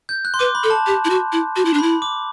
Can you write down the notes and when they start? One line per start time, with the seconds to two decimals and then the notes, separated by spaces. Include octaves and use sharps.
0.09 G6
0.25 F#6
0.34 C6
0.39 B4 D6
0.55 B5
0.64 A4
0.70 A5
0.87 G4
1.05 E4
1.10 F#4
1.32 E4
1.56 F#4
1.65 E4
1.74 D4
1.79 E4 B5
2.02 D6